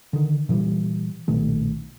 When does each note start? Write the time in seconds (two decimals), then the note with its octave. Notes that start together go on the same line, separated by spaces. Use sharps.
0.13 D3 D#3
0.49 A#2 E3 F3 G3
1.28 B1 A#2 D#3 A3